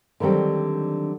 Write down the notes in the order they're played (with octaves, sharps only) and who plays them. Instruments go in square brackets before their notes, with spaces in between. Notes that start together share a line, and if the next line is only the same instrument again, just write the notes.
[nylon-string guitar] D3 D#3 F#3 G3 C4